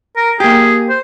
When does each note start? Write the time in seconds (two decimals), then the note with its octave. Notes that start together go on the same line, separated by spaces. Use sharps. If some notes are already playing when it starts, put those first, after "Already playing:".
0.16 A#4
0.40 A#3 G4 G#4
0.89 C5